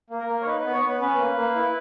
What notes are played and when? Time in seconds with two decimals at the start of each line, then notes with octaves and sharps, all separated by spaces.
0.10 A#3
0.19 A#4
0.27 A#3
0.42 C#5
0.46 D#4 B4
0.60 B3 B4
0.73 C#5
0.82 B3 B4
1.00 C#4 B4
1.18 A#3
1.37 A#3
1.55 E4